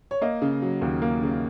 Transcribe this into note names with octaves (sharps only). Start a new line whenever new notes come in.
C#5
A#3 D#5
C#3
F#3
D#2
A#3
C#3